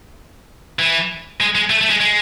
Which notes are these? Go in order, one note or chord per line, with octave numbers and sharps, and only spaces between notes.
E3
G#3
G#3
A3
A3
G#3
G#3